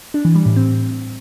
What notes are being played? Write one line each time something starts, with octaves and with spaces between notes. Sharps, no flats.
D4
E3
G3
A2
C4